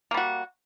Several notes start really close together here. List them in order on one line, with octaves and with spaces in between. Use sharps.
A#3 G3 F#4